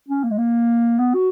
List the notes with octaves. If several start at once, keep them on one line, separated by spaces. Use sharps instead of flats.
C#4
A#3
G#3
A#3
B3
F#4